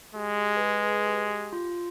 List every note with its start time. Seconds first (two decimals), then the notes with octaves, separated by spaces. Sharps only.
0.15 G#3 G4
0.38 G4
0.56 B4
0.61 G#4
0.84 B4
1.06 G4
1.30 G4
1.53 F4